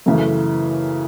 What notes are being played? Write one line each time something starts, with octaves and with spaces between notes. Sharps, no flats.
F#2 C#3 E3 A3